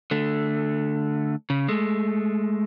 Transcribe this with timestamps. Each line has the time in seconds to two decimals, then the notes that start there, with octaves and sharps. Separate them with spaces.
0.11 D3 A3
1.50 C#3
1.68 G#3 A3